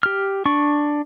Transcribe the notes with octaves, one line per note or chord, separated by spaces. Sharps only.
G4 F6
D4 C#6